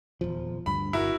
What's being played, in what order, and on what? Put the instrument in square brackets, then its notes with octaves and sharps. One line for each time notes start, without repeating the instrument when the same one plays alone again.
[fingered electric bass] D#1 E2 F3
[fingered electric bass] D2 G2 [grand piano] B5
[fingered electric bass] G1 [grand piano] E4 F#4 A#4